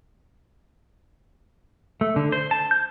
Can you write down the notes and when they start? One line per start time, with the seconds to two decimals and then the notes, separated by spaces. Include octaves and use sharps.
2.01 A3
2.16 D3
2.32 C5
2.51 A5
2.71 G6